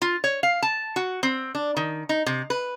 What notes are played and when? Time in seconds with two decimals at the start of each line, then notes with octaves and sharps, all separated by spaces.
0.02 F4
0.24 C#5
0.43 F5
0.62 A5
0.96 F#4
1.23 C4
1.55 D4
1.77 D#3
2.09 D#4
2.26 C3
2.50 B4